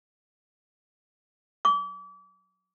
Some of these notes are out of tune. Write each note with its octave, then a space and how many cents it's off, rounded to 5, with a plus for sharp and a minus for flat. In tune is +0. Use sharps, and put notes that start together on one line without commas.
D6 -35